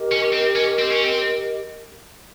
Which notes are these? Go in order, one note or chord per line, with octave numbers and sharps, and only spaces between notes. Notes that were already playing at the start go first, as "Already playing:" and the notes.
Already playing: G4 A#4 D#5
C#4
C4
C#4
C4
C#4
C4